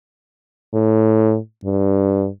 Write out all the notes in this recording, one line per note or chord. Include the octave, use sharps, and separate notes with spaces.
A2
G2